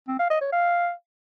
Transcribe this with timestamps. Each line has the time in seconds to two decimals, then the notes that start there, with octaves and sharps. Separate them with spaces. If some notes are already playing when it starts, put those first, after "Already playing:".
0.08 C4
0.19 F5
0.30 D#5
0.41 C#5
0.52 F5